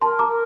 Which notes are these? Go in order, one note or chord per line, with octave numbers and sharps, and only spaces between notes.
A#4 A5 C6
A#5 D6
A#4